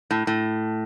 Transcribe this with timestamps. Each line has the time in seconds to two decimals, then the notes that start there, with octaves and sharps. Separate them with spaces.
0.11 A2
0.27 A2